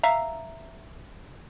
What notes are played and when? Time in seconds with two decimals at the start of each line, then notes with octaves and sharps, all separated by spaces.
0.03 E5 F5 A#5